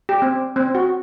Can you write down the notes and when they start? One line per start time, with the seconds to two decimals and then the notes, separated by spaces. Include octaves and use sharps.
0.09 G4
0.22 C4
0.56 C4
0.75 F#4